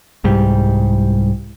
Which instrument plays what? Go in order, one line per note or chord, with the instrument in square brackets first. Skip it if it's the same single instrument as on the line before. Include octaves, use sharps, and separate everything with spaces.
[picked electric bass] C2 G#2 G3